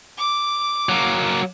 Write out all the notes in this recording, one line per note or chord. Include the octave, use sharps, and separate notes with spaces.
D6
F#3 A#3